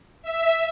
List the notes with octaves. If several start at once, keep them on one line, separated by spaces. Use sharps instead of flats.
E5